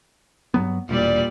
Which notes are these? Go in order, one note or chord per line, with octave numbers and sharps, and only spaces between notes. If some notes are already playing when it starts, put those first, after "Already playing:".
G2 F#3 B3
E1 A#2 G3 D5